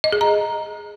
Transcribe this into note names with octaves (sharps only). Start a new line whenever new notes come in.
D#5
G#4
A#5